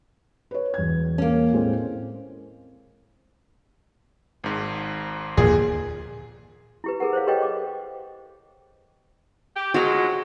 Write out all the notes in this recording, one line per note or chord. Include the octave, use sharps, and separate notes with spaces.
B4 C#5
E1 G#6
A#3 C#4
A2 G#3 C4
G#1 G#2
D#2 A#2 D3 F3 G#4
E4 G4 B4
G#4 A#4 B4 F#5
C5 C#5 F5
G4 A4 B4 C#5 D#5 G5
D6
G4
F3 F#3 G#3 F#4 A#5